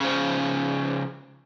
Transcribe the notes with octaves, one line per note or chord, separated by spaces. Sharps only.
C#3 F3